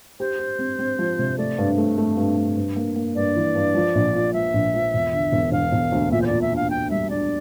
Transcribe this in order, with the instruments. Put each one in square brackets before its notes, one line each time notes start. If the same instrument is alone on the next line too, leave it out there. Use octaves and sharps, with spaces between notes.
[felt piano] G4 [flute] C5
[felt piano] G4
C4
C4
F3
C3
[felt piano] A3 [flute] D5
[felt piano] G2
A3
A3
G2
A3
G2
A#3
A#3
[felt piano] G2 [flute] D5
[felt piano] E3
G2
F3
A#1
A#2
[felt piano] F3 [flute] E5
[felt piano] A#1
F3
E1
D3
E1
[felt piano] E1 [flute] F5
[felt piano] E1
D2
[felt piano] A#2 [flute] E5
[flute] C5
D5
[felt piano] A#2
[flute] E5
[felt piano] D4
[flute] F5
[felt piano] D4 [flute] G5
[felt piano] G3 [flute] E5
[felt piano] D4 [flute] D5